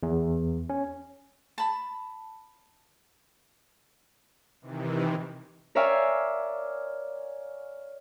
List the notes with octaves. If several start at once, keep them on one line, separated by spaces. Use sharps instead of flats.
E2
C#4
A5 B5
C3 D#3 E3
A#4 C#5 D5 E5 F5 G#5